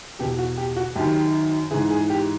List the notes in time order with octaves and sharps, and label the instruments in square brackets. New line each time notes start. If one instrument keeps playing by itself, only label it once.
[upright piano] E2 B2 G4
F#4
G4
F#4
F#2 D#3 G4
E3 G#4
G#2
G#4
G4